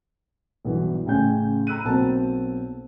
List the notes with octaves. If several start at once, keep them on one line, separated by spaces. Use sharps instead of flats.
B1 G2 E3
A1 C#3 G5 G#5 G6
A#5 B5 E6 F#6 D#7
B1 A#3 C4 A5